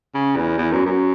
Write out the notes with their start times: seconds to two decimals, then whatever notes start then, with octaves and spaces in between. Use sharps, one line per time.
0.15 C#3
0.37 E2
0.58 E2
0.72 F#2
0.86 F#2